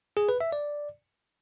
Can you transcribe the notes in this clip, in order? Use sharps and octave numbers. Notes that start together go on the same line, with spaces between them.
G#4
B4
E5
D5